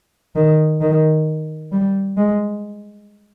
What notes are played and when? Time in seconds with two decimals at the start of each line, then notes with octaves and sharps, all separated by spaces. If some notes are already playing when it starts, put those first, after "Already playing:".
0.36 D#3
0.81 D#3
1.72 G3
2.17 G#3